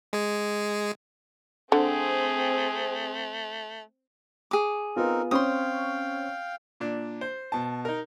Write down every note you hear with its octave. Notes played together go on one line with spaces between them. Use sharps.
G#3 G#4
D3 A3 C4 G#4
G#4 D6
B3 C4 D#4 F4 A#4
C4 C#4 F5 G5 C6 D#6
A#2 D4
C5
B2 A5
D#4 A#4